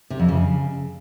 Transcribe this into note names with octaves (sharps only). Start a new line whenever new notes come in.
C3
F2
C#3